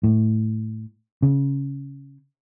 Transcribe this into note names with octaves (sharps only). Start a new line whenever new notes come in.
A2
C#3